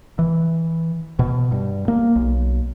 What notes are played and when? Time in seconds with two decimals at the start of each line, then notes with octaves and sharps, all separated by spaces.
0.19 E3
1.19 B2
1.52 G2
1.88 A#3
2.16 B1